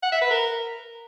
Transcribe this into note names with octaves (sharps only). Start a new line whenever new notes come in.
F#5
E5
B4
A#4